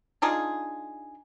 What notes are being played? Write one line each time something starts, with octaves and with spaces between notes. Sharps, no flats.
D4 D#4 F4 G#4